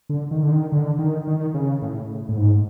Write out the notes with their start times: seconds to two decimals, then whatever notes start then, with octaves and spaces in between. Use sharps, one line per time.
0.09 D3
0.31 D#3
0.43 D3
0.51 D#3
0.72 D3
0.99 D#3
1.27 D#3
1.54 C#3
1.82 A2
2.29 A2
2.37 G#2